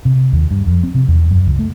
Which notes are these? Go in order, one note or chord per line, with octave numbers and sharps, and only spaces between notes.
C3
D#2
G2
F2
C4
C3
E2
F#2
C#2
A3